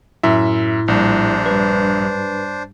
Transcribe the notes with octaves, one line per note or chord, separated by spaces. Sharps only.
F#2 A2 E4 E5
A#1 G3 D4 C5
G2 B4